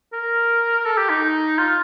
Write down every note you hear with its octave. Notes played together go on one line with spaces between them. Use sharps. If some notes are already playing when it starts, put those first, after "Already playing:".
A#4
A4
G4
D#4
F4